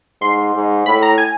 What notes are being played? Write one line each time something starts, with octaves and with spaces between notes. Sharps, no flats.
G#2 C6
G#2
A2 B5
A#5
G#5